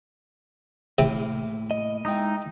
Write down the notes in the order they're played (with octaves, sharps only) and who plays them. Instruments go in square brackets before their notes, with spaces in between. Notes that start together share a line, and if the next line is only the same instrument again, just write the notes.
[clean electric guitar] A2 A#3 E4 [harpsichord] C3
[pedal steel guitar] D#5
[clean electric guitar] G#3 E4 G5 [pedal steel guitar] D#4 D#6